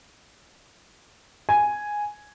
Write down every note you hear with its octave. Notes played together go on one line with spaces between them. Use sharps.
G#5